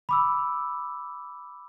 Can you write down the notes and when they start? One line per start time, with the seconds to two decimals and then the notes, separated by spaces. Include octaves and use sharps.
0.09 B5 D6 E6